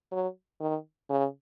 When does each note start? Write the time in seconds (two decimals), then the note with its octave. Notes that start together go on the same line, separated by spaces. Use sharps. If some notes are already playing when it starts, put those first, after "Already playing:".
0.12 F#3
0.60 D#3
1.10 C#3